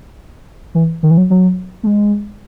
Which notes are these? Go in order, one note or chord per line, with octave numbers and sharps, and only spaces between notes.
E3
D#3
E3
F#3
F#3
A3
G#3